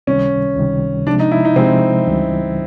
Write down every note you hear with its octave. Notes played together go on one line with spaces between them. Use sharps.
C#2 C3 D#3 G3 C#4
C#2 C3 D#3 G3
C3 F3 G#3 D4
D#4
E4
D#4
C3 F3 G#3 C4
C#2 C#3 E3 G3